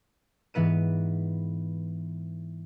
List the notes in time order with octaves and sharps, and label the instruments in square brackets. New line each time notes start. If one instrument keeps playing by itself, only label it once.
[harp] G#2 E3 B3 B4 D#7